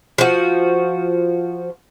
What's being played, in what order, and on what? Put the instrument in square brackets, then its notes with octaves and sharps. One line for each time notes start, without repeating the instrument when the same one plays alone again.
[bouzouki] F3 F#4